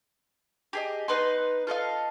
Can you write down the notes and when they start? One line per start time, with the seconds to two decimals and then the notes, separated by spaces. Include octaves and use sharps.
0.73 G4 G#4 D#5
1.08 B3 D#4 B4 C6
1.67 F4 A4 D#5 F5